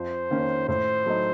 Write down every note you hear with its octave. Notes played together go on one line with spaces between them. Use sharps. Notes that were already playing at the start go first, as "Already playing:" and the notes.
Already playing: F2 C5
D#3 A#3 C#4
A2 C5
F#3 A3 D#4